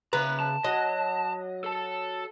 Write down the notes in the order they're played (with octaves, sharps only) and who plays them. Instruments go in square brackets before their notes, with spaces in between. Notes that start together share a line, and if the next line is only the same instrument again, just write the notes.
[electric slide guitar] C#3 A#5 [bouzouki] B4
[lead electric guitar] A5
[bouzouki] F#3 [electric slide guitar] D#5
[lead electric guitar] A4 A5